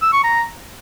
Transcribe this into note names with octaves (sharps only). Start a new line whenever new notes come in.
E6
C#6
A#5